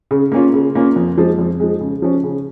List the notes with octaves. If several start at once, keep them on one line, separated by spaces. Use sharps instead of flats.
C#3
A#3 C#4 F4
C#3
A#3 C#4 F4
F2
F3 G#3
F2
F3 G#3
C#3
F3 C#4
C#3